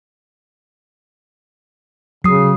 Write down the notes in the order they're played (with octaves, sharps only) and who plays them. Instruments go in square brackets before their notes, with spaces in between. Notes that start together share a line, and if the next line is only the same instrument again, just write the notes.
[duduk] C#3 [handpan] F#3 [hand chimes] D#6 C7